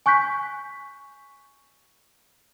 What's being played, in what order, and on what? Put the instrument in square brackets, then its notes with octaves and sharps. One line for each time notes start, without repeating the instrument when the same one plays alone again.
[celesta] G#5 C#6 F#6 G6 B6